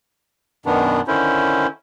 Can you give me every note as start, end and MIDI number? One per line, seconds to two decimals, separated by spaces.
0.66 1.01 42
0.66 1.01 47
0.66 1.01 51
0.66 1.01 59
0.66 1.01 62
1.08 1.67 50
1.08 1.67 51
1.08 1.67 61
1.08 1.67 64
1.08 1.67 72